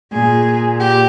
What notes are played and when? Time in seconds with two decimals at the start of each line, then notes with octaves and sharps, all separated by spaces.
0.12 A#2 G#4
0.78 G4